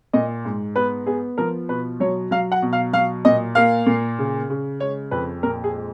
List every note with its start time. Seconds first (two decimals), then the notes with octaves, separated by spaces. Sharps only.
0.13 A#2 D#5
0.45 G#2
0.76 B3 B4
1.06 B3 G#4
1.38 F3 A#4
1.69 B2 B4
2.00 F#3 C#5
2.31 F#3 F5
2.52 F#5
2.62 B2
2.73 F5
2.93 F#3 F5
3.25 A#2 D#5
3.55 A#3 F5
3.86 A#2
4.19 C#3
4.50 C#3
4.80 G#3 C#5
5.11 F2 B4
5.43 A#2 A#4
5.64 G#4
5.73 G#3